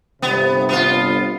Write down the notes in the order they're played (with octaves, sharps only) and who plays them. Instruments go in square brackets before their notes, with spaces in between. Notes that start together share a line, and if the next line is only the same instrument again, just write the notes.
[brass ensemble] G1 C3 [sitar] B3
[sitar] B3 F4